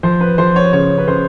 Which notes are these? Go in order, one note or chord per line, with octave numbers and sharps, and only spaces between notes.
F3 C5
B4
F3 C5
C#5
C#3 C#5
B4
C#3 C5